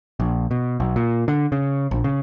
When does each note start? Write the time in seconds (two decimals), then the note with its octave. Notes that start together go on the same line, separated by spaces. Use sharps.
0.20 A#1
0.51 B2
0.80 B1
0.96 A#2
1.28 D3
1.52 C#3
1.91 A#1
2.04 C#3